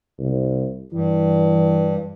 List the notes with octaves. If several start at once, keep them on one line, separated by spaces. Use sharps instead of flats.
C2
G2 E3